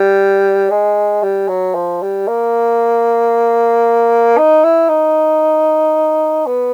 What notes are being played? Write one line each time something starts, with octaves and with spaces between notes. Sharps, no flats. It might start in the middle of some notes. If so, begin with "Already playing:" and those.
Already playing: G3
G#3
G3
F#3
F3
G3
A#3
D#4
E4
D#4
B3